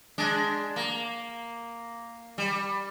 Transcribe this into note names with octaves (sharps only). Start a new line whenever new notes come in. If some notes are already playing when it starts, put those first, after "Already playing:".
G#3 D4
A#3
G3